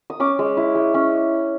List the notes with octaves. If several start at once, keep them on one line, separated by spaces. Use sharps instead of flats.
D#6
C#4 D6
G#3
E4
G#3
C#4